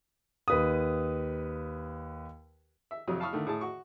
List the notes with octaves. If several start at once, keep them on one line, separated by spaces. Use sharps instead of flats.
D#2 B4 D#6
E5
F2 C3 F#3 D#6
F5 A5 B5 C#6 D#6 F6
D3 D#3 A3
A2 G#4 A5
F#4 C#6